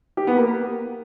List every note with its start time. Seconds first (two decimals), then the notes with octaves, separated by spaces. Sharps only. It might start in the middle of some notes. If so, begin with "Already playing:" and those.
0.17 G4
0.27 B3
0.37 A#3